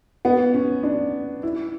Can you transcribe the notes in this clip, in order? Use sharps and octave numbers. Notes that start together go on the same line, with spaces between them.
B3
C#4
D4
E4